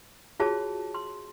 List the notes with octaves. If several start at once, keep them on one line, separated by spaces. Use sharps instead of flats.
F4 F#4 G#4 C#5 A5
C6